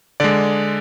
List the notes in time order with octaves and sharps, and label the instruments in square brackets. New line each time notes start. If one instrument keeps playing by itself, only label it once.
[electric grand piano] D3 G#3 D5